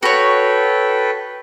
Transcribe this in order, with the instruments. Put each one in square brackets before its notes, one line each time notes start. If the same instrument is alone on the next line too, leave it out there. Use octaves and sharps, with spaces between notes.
[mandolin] F#4 C#5 [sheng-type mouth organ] A4 B4 G5